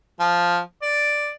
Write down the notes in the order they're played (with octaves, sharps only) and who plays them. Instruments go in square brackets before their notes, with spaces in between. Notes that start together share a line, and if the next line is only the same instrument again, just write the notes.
[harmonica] F3
D5